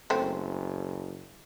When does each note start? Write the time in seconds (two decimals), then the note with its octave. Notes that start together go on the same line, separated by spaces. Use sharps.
0.10 F#1 A3 C4